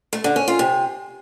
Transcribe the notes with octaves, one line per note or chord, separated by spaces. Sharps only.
A3
D3
C#4
F4
C3